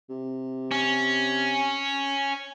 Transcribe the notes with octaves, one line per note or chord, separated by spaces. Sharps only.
C3
C#4